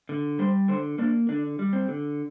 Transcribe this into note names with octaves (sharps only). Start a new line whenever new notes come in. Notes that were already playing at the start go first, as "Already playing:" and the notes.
D3
G3 C5
D3 C5
A#3 D4
D3 D4
G3
C4
D3